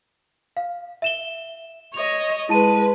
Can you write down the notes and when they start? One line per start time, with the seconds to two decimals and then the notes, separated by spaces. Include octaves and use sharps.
0.57 F5
1.02 E5 E7 G7
1.94 C#5 D#5 F7
2.49 G#3 E4 B4 A5 D#7